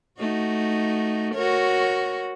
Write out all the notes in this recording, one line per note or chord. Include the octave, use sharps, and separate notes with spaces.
A3 D#4 F#4
F#4 A#4 C#5